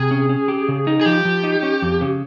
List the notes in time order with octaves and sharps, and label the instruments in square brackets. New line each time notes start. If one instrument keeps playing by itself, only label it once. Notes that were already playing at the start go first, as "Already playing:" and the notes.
Already playing: [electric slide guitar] C3 [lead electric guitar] G#4
[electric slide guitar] C#4
C#4
G4
C#3
D#4
[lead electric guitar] G#4
[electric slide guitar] F3 [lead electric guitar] G4
[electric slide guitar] F3
D#4
C#4
F2
C#3